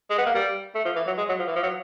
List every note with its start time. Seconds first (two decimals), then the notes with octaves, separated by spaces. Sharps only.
0.10 G#3
0.18 B3
0.26 A#3
0.34 G3
0.75 A3
0.85 F3
0.96 E3
1.07 F#3
1.18 G#3
1.29 F#3
1.39 F3
1.48 E3
1.56 F3
1.63 F#3